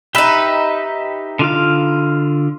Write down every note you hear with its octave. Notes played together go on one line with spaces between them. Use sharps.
D#4 G4 B4 E5
D3 F4 F5